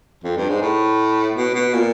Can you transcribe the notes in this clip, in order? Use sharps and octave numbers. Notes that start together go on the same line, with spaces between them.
F2
G2
G#2
A2
B2
B2
A#2